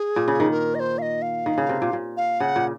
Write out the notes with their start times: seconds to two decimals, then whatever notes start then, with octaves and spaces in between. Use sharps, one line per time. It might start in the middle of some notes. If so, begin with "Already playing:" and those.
Already playing: G#4
0.16 A#2
0.28 C#3
0.40 D#3
0.51 A#4
0.75 D#5
0.80 C5
0.98 F5
1.02 D#5
1.22 F5
1.46 D#3
1.58 C#3
1.69 C3
1.82 A#2
1.93 A#2
2.17 F5
2.40 C#3 F#5
2.56 A#2